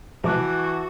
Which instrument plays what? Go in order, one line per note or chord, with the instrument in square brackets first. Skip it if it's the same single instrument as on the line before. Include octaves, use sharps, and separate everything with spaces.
[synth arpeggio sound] C3 F3 G#3 [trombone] E3 [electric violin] F#4 [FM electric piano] A5 D6 F#6